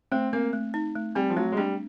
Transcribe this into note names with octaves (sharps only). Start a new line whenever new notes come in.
A3 C4
A#3 C4
A3
D#4
A3
G3 C4
F3
F#3 A3
G#3
G3 D4